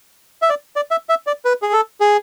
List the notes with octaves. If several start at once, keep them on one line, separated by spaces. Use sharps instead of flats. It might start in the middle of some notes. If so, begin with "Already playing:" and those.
E5
D5
D5
E5
E5
D5
B4
G#4
A4
G#4